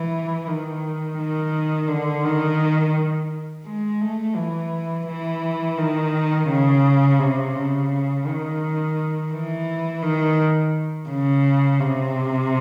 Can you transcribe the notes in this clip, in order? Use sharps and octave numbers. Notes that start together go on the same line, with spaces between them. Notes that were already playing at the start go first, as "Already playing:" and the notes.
Already playing: E3
D#3
D#3
D3
D#3
G#3
A3
E3
E3
D#3
C#3
C3
C#3
D#3
E3
D#3
C#3
C3